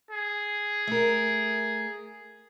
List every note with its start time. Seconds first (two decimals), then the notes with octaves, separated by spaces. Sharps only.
0.11 G#4
0.87 A3 A#4